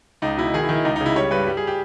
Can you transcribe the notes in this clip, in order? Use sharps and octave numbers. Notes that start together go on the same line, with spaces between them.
C#2 D#4
B2 E4
D#3 G#4
E4
D#3
E4
C#2 D#4
D#4
C#3
E4
G3 C#5
G2 B4
G3
G#4
G4